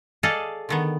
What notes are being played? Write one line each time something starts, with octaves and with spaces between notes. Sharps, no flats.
G#4 A4 D5 D#5 F5
D3 D#3 B3